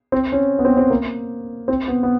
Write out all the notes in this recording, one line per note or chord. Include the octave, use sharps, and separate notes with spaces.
C4
C#4
B3
C4
C4
A#3
C4
B3
B3